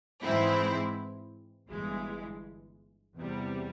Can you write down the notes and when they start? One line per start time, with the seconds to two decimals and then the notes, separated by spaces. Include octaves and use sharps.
0.23 G#2 E3 G#3 C4 E4
1.70 G1 G2 E3 G#3
3.17 E2 C3 G3